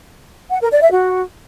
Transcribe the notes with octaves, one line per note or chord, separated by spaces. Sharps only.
F#5
A#4
D5
E5
F#4